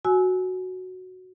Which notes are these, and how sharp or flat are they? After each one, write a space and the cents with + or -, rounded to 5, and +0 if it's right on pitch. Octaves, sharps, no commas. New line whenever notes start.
F#4 +0 G#5 +20 E6 -20